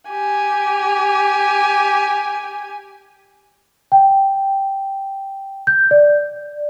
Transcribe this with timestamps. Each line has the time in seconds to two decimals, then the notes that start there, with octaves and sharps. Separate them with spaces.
0.10 G4 G#5
3.92 G5
5.67 G6
5.91 D5